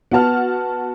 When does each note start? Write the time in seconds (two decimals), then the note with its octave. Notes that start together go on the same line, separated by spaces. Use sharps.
0.11 B3 F#4 F#5 A5 F6